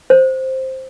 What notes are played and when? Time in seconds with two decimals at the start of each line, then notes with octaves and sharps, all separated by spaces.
0.10 C5